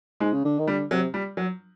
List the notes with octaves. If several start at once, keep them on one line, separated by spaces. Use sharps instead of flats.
G#2 G#3
C#3
D3
D#3
D3 G3
C3 F#3
G3
F#3